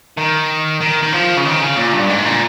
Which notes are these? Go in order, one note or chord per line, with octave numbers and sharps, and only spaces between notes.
D#3
D#3
D#3
F3
C#3
D#3
C#3
A#2
G2
G#2
A#2